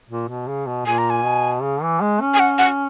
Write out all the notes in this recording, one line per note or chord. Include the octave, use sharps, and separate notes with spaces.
A#2
B2
C#3
B2
A#2 G#5
A#5
G#5
B2
C#3
E3
G#3
C#4
G#5
F#5
F#5